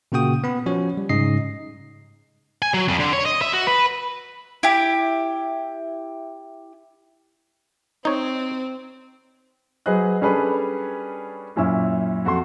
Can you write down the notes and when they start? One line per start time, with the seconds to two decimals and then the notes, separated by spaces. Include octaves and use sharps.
0.12 A#2 C#3 A#3 F#4 G5 D#6
0.44 B3 B5
0.66 F3 C#4 F#4 C#5
0.97 G3
1.09 G#2 C#3 D#4 D#5 C7
2.62 G#5
2.74 F#3
2.88 F2
2.99 D3
3.13 C#5
3.26 D#5
3.42 E5
3.53 F#4
3.67 B4
4.63 E4 G4
8.05 C4 D#4 C#5
9.86 F#3 G#4 B4 C5 D#5 F#6
10.21 G3 C#4 D4 G#4 A4 B4
11.56 F#2 A#2 C#4 E4 E6
12.25 F2 F#4 A4 C6